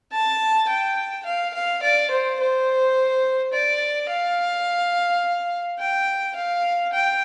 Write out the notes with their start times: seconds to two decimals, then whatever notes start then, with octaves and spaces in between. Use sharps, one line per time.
0.12 A5
0.69 G5
1.25 F5
1.54 F5
1.82 D5
2.10 C5
2.40 C5
3.53 D5
4.09 F5
5.79 G5
6.35 F5
6.93 G5